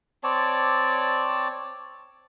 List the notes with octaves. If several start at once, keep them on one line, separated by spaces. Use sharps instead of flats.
C4 C#5 D5 A5